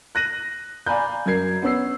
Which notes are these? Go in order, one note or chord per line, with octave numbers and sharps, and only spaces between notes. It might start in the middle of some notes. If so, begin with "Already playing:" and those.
F#6 A#6 D#7 F#7
D5 F5 G#5 A#5 B5 G6
F#2 A#4 G#6 C7
B3 C#4 E6 C7